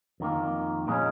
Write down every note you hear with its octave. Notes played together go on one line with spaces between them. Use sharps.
F2 D#3 A#3
A#2 G#3 C#4 D#4